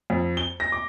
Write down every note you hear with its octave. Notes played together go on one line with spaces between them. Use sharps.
F2
G7
A#6
D6